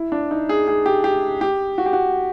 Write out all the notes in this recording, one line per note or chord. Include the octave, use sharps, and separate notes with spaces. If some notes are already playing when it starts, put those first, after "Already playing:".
Already playing: E4
D4
D#4
G#4
G#4
G4
G4
G4
F#4
G4
F#4